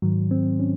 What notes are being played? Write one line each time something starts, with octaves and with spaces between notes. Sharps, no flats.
G#2 D#3 F#3
C4
C#4